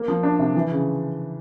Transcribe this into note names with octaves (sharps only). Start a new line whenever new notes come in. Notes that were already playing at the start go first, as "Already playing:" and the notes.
Already playing: A#3
F3
D4
C3
E3
C#3